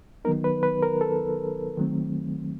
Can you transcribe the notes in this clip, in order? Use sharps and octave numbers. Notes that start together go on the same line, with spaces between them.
D#3 F#3 B3 D#4 A#4
B4
B4
A#4
A4
D#3 F#3 A3 C4